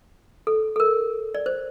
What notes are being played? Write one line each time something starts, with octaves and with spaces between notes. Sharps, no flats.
A4
A4
A#4
D5
C5